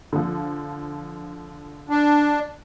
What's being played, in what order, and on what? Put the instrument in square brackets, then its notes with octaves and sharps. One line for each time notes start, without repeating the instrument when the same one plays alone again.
[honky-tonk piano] D3 F3
[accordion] D4